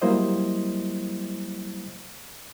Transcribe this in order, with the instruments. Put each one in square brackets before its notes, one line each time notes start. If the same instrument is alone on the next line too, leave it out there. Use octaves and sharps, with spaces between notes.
[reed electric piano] F#3 G3 A#3 E4 C5 D#5